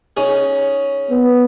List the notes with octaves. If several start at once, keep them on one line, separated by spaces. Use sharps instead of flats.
C#4 D#4 G#4
B3